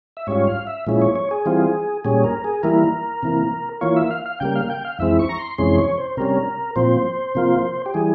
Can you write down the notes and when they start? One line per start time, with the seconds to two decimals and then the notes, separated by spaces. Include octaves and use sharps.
0.17 E5
0.27 G#2 G3 C#4 F4 C#5
0.47 F5
0.67 E5
0.87 A#2 F3 G#3 C#4 E4
1.02 C#5
1.15 C#5
1.31 G#4
1.46 E3 G3 C4 F4
2.05 A#2 G3 C#4 G#4
2.24 A#4
2.44 G#4
2.63 E3 G3 A#3 E4 A#4
3.23 C3 E3 A#3
3.81 E3 A#3 F4 C#5
3.96 E5
4.11 F5
4.26 F5
4.40 C#3 G3 A#3 G5
4.56 F5
4.70 G5
4.85 F5
4.99 F2 E3 G#3 C4 E4 E5
5.19 C#6
5.29 A#5
5.39 C6
5.58 F2 C3 E3 G#3 C#4 C6
5.78 C#5
5.98 C5
6.17 C3 G3 C#4 A#4
6.76 A#2 F3 C4 C5
7.35 C3 F3 A#3 F4
7.86 G4
7.94 E3 G3 G#4